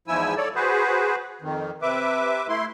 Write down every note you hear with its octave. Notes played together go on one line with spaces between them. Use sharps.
E2 G#2 F3 E4 G#5 E6
A4 C#5 D5
F#4 G#4 B4 C5
F2 D#3
C3 B4 E5 D6
A3 E4 C6